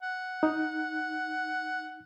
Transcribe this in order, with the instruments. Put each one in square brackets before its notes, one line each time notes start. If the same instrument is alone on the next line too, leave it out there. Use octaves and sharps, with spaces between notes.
[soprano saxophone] F#5
[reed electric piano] D#4